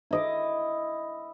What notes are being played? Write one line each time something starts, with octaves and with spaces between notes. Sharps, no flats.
E4 D#5 D6